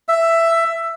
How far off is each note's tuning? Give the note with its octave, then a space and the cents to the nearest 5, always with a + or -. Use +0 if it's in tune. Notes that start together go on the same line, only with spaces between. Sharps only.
E5 +10